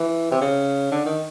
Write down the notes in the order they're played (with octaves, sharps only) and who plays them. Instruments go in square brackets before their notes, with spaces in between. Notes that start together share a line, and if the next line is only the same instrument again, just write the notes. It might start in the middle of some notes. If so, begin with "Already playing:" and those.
Already playing: [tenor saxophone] E3
C3
C#3
D3
D#3